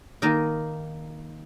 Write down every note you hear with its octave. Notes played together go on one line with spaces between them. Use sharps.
D#3 A#3 D#4 A#4